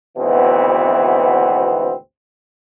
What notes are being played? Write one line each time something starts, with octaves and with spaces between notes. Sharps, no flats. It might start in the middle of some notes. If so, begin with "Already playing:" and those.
G#1 D2 B2 E3 B3 C4